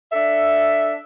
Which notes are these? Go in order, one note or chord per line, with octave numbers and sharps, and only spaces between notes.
D4 A4 E5